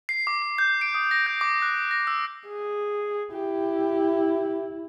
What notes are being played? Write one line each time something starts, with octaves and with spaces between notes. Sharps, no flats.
C7
D6
D6
G6
D7
D#6
A#6
G6
D6
F#6
A#6
E6
G#4
E4 G4